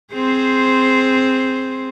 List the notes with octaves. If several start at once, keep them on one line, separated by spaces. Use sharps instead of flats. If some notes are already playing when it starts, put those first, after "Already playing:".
C4 G#4 C5